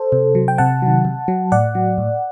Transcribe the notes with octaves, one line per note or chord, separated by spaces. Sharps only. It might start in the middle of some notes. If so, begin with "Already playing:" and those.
Already playing: A4 C5
C3
F#3
G5
C3 F#5 A5
D#3 F#3
C3
F#3
A2 D5 F#5
F#3
A2